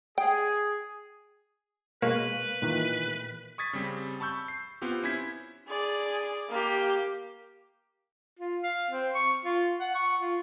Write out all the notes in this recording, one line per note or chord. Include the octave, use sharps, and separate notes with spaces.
G#4 G5
B2 G#3 A#3 B4 C#5
A#2 D#3 E3
C#6 D#6 G#6 A6 B6
C#3 G3 C4
A5 B5 C#6 E6 G6
C7
B3 C4 F4 G4
C#4 E4 C5 G#6 B6
G#4 D5
A#3 G4
F4
F5
C4
C#6
F4
F#5
C#6
F4